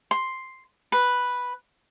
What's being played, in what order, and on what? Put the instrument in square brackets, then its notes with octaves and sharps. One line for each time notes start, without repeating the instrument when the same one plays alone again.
[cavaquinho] C6
B4